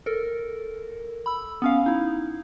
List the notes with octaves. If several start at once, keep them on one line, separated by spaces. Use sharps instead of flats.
A4 A#4
B5 E6
B3 C#4 F5
D#4 E4